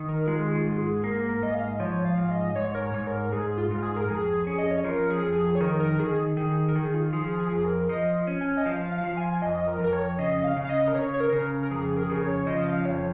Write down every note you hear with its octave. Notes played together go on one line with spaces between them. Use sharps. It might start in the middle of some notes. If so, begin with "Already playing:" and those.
Already playing: D#3
A#4
G#3 F4
G#4
F4
G#2
G#4
A#3 A#4
A#4
G#2 D#5
F5
D#5
F3 C#5
F5
G#2
D#5
G#2 C#5
A#4
C#5
G#2
A#4
G#2 G#4
F4
G#2
G#4
A#4
F2 G#4
C#4
D#5
C#5
F3 A#4
G#4
F2
G#4
C#5
D#3 A#4
A#4
D#3 G#4
D#3 G#4
A#4
D#3 G#4
F4
F3 G#4
G#4
F2
A#4
F3 D#5
C#4
G#5
D#5
F3 F5
F5
F3
G#5
F2 D#5
A#4
F2 A#4
C#5
C#3 D#5
F5
C#3
F5
D#5
A#4
C#3 C#5
C#5
A#4
C#3
A#4
F2 G#4
A#4
G#4
C#3 A#4
C#5
F3 D#5
F5
F2 C#5